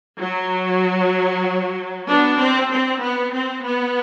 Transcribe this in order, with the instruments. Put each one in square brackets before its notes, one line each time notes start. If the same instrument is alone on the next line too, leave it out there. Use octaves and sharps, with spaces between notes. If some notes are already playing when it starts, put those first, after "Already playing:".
[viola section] F#3
B3 D4
C4
C4
B3
C4
B3